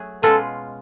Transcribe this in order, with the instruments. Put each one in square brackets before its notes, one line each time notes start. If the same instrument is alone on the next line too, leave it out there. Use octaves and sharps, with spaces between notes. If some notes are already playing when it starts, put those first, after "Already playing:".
Already playing: [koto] F#3 A3 G#4
[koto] B2 G#3 C#4 F4 [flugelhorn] A4